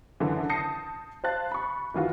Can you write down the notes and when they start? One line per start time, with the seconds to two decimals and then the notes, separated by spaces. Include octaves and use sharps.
0.20 F#2 D3 E3
0.49 A5 D#6 G6 A#6 C7 C#7
1.24 C5 F5 A5 F#6 A6
1.52 B5 C#6
1.94 D#3 E3 F4 F#4